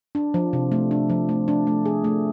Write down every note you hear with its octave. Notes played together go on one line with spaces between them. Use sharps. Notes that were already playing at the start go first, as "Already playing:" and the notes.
D4
F3
C3
A3
D4
F3
A3
D4
A3
G#4
A3